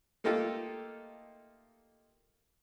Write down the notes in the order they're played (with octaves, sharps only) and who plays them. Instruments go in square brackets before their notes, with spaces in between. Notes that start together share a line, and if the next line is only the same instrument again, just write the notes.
[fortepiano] A3 A#3 D#4 F4 G4 A4